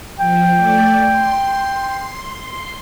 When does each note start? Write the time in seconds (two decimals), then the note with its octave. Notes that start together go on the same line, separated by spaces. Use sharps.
0.19 F3 G5
0.55 A3 D5
1.08 C6